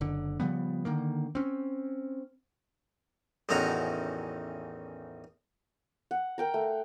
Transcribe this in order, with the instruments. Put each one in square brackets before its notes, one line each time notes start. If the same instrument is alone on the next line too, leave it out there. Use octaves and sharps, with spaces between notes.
[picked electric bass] F#1 D3
C#3 F3 G3 B3
D3 D#3 A#3
C4 C#4
[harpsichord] A1 E2 D#3 C#4 F#4 A#5
[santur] F#5
A#4 G5 A#5
A3